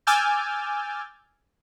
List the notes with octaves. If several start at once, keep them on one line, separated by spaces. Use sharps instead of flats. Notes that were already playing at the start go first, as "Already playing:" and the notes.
G#5 D6 E6 F6 G6 A6